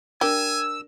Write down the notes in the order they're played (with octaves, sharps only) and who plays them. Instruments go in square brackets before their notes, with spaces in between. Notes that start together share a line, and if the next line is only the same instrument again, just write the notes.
[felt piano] D4 A#4 [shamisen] G4 [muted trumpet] G#5 [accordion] E6